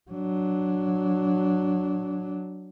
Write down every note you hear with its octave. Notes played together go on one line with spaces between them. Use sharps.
F#3 D4